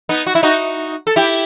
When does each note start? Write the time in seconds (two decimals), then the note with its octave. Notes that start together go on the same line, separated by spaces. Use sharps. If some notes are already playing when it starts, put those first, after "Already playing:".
0.09 B3 D#4
0.27 F#4
0.35 E4
0.43 D#4 F#4
1.07 A4
1.16 E4 G4